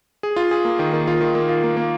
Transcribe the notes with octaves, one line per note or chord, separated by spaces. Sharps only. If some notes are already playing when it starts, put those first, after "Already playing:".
G#4
F4
G#4
A#3
D#3
D#3
F4
D#3
A#3
F4
A#3
A#3